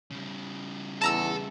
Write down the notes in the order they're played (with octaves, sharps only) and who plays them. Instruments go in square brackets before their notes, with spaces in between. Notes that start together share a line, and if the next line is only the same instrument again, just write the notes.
[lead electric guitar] C#3 G3
[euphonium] E2 [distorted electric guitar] A4 [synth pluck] A5 A#5 E6